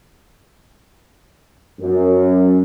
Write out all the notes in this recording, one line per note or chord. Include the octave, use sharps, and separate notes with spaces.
F#2